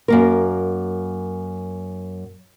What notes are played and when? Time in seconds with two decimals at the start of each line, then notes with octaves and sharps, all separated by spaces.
0.08 F#2 A#3 A#4